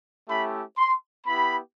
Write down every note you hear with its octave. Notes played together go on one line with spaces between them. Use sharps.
A3 C#4 E4 G4 B5
C6
B3 E4 G4 B5